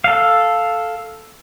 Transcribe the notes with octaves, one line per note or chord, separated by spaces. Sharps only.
A4 F5